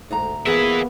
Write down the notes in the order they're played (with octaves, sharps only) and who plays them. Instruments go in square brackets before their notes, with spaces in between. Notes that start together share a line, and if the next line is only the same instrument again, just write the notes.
[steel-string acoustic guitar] D2 G#2 A#5
[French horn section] F3 A#3 B3 [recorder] G#4 [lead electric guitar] B4 E5